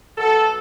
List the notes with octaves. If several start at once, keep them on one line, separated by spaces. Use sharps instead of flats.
B2 F#3 A4